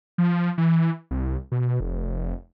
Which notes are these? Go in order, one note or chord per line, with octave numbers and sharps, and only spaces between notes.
F3
E3
C2
B2
F1